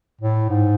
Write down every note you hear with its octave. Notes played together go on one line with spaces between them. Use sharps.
A2
G#2